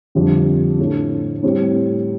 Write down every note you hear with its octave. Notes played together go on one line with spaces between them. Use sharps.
F2 D3 G3
A2 A3 D4
A2 G3 C4